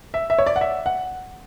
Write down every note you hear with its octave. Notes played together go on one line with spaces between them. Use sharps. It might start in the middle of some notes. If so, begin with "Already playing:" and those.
E5
E5
C#5
D5
F#5
E5
F#5